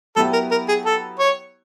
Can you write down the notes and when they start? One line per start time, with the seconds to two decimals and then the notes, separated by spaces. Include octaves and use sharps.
0.16 F#3 B3 E4 G4 A4
0.33 A#4
0.51 A#4
0.68 G#4
0.85 A4
1.19 C#5